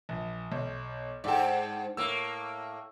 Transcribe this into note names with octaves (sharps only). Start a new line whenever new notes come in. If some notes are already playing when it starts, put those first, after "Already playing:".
A#1
B1
G#2 A4 D5 G5
A2 A#3 E6